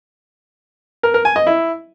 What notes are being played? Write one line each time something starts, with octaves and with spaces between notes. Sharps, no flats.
A#4
A#4
G#5
D#5
E4